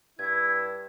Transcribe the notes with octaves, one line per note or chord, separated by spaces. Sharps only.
G2 E4 G#6